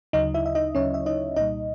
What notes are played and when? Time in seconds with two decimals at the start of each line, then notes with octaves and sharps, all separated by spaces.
0.13 D2 C#3 F#3 D#4 D#5
0.34 E4 E5
0.46 E5
0.55 D#4 D#5
0.75 D2 C#3 F#3 C#4 C#5
0.94 E5
1.06 D#4 D#5
1.36 C2 A#2 G3 D#4 D#5